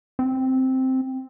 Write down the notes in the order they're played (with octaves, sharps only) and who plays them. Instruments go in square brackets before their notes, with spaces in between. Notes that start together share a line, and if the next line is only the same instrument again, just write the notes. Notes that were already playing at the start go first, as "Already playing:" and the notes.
[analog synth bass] C4